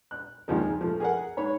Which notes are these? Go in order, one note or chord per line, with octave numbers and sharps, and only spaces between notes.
F#6
G#1 D#2 F3 G#3
G#4
F3 A3
G#4 A#4 F#5
G#2 C#5 B5